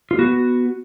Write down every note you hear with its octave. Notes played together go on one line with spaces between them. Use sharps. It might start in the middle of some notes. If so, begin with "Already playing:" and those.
F4
B3 F#4